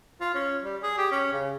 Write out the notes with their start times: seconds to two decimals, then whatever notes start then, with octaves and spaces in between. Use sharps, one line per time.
0.21 F4
0.35 C#4
0.64 G3
0.83 G#4
0.98 G4
1.12 C#4
1.33 C#3